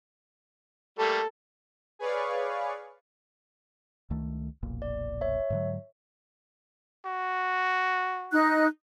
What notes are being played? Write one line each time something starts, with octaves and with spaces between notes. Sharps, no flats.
G3 A3 A#3 A4
G#4 B4 C#5 D5 F5 C#6
C#2 D#3 A3
F1 B1 A#2
D5
C#5 E5
G#2 D3 F#3
F#4
D#4 F#6